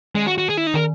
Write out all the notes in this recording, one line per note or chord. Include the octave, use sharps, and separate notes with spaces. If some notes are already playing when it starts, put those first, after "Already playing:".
D#3 G#3
F#4
F#4
G#4
E4
D#4
D#3 A#4